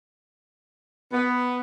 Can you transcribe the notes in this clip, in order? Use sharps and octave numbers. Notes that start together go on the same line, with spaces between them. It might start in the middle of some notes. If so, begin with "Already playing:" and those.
B3